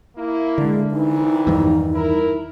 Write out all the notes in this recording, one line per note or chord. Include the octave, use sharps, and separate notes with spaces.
A#3 E4
D3 G#3
C2 E3 D#4
E2 G2 D#3
E4 A#4